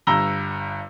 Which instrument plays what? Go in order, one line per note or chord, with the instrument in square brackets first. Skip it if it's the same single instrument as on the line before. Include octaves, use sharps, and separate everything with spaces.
[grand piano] G1 G2 A#5 E6 A#6 G7